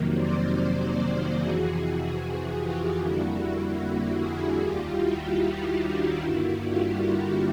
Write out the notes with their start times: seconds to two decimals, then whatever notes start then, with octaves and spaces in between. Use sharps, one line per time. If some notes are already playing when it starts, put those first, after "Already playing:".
Already playing: F2 C3 D#3 F#3 A#3
0.12 C5 D5
0.53 C5 D5
0.94 C5 D5
1.34 F2 C3 E3 F#4 G#4
1.75 F#4 G#4
2.56 F4 G4
2.96 F2 D3 G3 A#3 E4 F#4
3.38 E4 F#4
3.78 E4 F#4
4.19 F#4 G#4
4.59 D#2 D#3 G3 F4 G4
4.99 E4 F#4
5.40 D#4 F4
5.80 D4 E4
6.21 G2 D3 G3 A#3 E4 F#4
6.62 F4 G4
7.02 E4 F#4